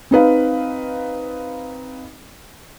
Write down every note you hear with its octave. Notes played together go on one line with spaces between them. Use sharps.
C4 D#4 B4 F5